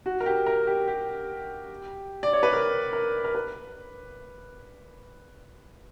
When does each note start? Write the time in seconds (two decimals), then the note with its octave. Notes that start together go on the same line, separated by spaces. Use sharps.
0.06 F#4
0.20 A#4
0.26 G4
0.46 A#4
0.67 G4
0.88 G4
2.23 D5
2.33 C#5
2.43 B4
2.53 A#4
2.93 A#4
3.24 A#4
3.35 B4